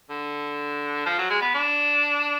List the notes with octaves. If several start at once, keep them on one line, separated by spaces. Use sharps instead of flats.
D3
F3
F#3
G#3
B3
D4